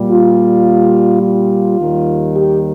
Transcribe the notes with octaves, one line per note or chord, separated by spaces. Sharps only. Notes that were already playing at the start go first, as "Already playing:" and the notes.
Already playing: A#2 G3
F4
F4
D#2 D#3 G3
G4